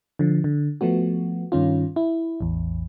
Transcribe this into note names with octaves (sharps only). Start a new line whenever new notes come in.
D3 F3
D3
F3 A3 B3 F#4
G2 D#3 C#4 F4
E4
A1 E2